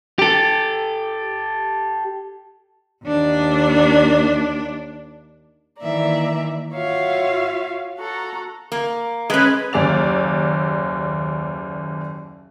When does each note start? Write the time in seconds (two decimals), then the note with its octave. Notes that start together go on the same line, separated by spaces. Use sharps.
0.19 G4 A4
3.04 D#2 D4
5.80 D#3 E3 A#3 D5 E5 A#5
6.74 F4 F#4 C#5 E5 F5
8.00 F#4 A4 A#5
8.72 A#3
9.30 G#3 C#4 B4
9.73 F#1 D#2 G#4 D5 F7